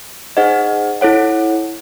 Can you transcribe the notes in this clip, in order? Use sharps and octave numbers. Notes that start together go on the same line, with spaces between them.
D#4 G#4 C5 D#5 F#5
E4 A4 C#5 F#5